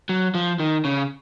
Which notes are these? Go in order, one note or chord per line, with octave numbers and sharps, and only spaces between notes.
F#3
F3
D#3
C#3